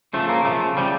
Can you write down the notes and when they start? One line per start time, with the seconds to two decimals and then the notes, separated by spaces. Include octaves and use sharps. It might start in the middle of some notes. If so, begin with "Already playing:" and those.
0.13 C#3 F3 A3
0.29 A#3
0.45 C#3 F3 A3
0.77 C#3 F3 G3